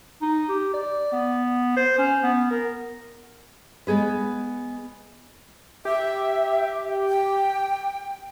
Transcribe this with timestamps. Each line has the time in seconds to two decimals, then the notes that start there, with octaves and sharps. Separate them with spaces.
0.22 D#4
0.49 G4
0.74 D5
1.12 B3
1.77 C5
1.98 C#4
2.23 B3
2.51 A#4
3.87 G#3 B3 G#4 B4
5.85 G4 E5
7.09 G5